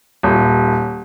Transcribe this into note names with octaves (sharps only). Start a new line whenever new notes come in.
D#1